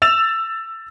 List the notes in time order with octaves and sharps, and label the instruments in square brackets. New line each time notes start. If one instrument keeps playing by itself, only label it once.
[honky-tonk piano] E6 A6 E7 F7